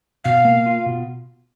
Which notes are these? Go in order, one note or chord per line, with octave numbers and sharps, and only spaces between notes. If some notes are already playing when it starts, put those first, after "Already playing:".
B2 F5
A#3
F4
B2